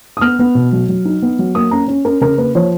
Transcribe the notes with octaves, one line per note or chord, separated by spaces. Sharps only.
D#6
B3 F6
B3
B2
F#3
F#3
D#4
B3
F#3
A#3 D#6
C#4 A#5
C#4
C#4 A#4
C#3 A#4
A#3 B4
F3 C#5